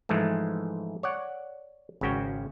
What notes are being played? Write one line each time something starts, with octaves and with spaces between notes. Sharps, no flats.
G#2 E3 F3 G#3 A3
C#5 D5 F#5
G#1 C#3 C#4 F#4 G5